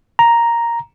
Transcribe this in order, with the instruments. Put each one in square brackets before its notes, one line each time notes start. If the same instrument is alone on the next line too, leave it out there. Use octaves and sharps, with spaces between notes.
[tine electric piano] A#5